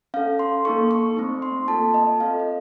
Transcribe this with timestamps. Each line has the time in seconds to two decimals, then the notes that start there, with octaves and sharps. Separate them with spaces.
0.14 C#4 A4 F5
0.39 C6
0.65 A#3 D#4 A4 C#6
0.91 C#6
1.17 A3 C4 D#4
1.42 C6
1.68 A#3 F4 A4 A5
1.94 D#5
2.20 C4 F4 A4 F5
2.40 D#5